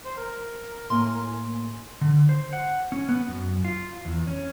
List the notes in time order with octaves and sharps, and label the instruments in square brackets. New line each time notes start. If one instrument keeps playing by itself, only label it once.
[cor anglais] C5
A#4
[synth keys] A2 A#3 G#5 [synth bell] C6
[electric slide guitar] D3
C5
F#5
C#4
B3
F#2
F4
E2
C#4